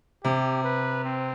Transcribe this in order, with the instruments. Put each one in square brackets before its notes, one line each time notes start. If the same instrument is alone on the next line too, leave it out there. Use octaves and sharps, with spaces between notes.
[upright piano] C3 [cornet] G4
[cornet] B4
C4